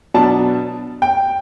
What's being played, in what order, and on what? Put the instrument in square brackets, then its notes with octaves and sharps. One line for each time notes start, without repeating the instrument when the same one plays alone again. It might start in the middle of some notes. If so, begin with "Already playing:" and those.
[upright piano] B2 F#3 B3 D4 A5
G5